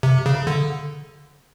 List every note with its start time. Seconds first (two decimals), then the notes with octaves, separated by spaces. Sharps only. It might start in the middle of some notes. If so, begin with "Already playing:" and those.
0.03 C3
0.26 C#3
0.47 D3